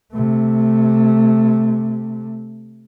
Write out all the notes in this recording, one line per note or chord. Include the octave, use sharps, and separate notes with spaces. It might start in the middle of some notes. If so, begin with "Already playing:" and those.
C3 A3